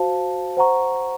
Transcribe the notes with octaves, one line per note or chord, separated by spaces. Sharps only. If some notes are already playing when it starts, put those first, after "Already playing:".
Already playing: F#4 C5 F5 A5
C5 F#5 A#5 C#6